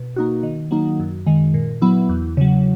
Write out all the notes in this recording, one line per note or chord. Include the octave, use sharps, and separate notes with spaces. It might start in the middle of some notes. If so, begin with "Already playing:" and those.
Already playing: B2
A#3 D#4 F#4
D#3
F#3 A#3 D#4
F#2
D#3 G#3
A#2
F#3 B3 E4
E2
C#3 F#3